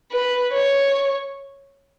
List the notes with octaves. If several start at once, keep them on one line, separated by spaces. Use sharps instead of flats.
B4
C#5